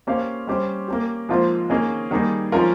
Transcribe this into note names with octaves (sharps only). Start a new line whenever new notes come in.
A#3 C#4 G4 C5 F5
G3 C#4 G4 C5
A#3 C#4 G4
G#2 F3 A#3 F4 C5
D#3 A#3 C#4 G#4 D#5
D#3 G3 A#3 D#4 G#4
F3 G#3 C#4 F4 A#4